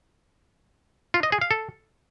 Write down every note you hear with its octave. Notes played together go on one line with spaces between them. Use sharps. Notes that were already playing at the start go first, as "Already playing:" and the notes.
F4
D#5
G#4
F5
A4